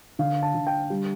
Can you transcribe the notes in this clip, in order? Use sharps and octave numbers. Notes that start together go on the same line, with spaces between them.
D3 F5
A5
D3
G5
G3